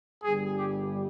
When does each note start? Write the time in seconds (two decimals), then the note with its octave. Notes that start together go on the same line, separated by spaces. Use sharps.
0.23 G1 G2 G3 G#4
0.57 G4